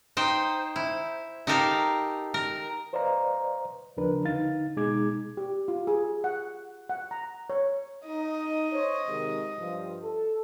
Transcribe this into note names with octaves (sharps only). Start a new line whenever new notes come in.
D#4 C5 G5
E4
D#4 G4 A4 A#4 F5
A#4
B4 C5 D5 D#5 F5 A#5
D#2 C#3 F3 D4 A#4 B4
D3 D#4 F5 A6
B2 G#3 D#4 G#4 D6 G#6
G4
F4
G#4
F#5
F#5
A#5
C#5
D#4 D#5
C5 C#5
C3 D#3 G#3
G2 F3
A4